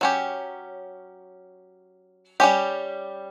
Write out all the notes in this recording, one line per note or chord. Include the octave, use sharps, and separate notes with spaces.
F#3 C#4 G4
G3 C#4 G4